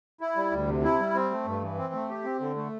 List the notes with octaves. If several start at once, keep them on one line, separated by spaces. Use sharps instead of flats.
E4
G3
D2
C3
E4
G3
C4
A3
G2
E3
C4
A3
G4
C4
D3
A3